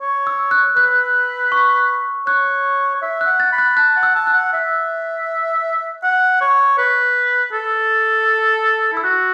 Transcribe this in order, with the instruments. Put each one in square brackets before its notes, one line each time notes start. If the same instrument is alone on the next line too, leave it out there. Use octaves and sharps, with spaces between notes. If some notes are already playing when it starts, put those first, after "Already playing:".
[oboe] C#5
[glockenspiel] E6
F#6
[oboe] B4 [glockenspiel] F#6
[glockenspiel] C#6
[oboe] C#5 [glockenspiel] F#6
[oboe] C#5
E5
[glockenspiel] F#6
[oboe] F#5
[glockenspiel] A6
[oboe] B5
[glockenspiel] F#6
[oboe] A5 [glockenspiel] F#6
[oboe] F#5
[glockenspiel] E6
[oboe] A5
[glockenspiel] F#6
[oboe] F#5
E5
F#5
C#5
B4
A4
[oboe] E4 [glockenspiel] E6
[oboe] F#4 [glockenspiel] F#6